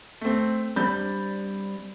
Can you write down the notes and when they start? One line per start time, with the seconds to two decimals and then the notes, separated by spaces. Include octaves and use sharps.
0.21 A3 C4
0.76 G3 C4 D4 B5 G6 A6